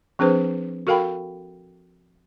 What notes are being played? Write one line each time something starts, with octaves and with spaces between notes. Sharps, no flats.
F3 C4 D4 G#4 B4 C5
F#4 A4 A#4 F5 G5 B5